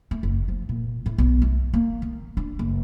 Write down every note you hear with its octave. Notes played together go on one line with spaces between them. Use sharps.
A3
F#1
F3
A#2
A2
B1
A3
A#3
D#3
D4
F#1